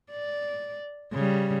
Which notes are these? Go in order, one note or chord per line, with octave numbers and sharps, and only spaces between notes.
D5
C#3 G3